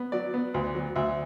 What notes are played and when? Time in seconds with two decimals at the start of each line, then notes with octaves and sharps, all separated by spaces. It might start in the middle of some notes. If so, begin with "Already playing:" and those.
Already playing: B3
0.12 F#3 D5
0.34 B3
0.54 D2
0.75 F#3
0.96 D2 E5